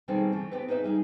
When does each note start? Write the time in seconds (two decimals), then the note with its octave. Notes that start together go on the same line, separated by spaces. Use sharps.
0.08 B2 D#3 G3 C4 G#4 A4
0.32 E3 A3
0.51 B3 C4 G4 A4 B4
0.68 D#4 G#4 B4 C#5 E5
0.84 G3 D#4 G#4